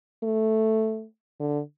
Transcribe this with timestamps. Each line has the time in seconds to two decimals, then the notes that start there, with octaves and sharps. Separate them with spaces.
0.24 A3
1.40 D3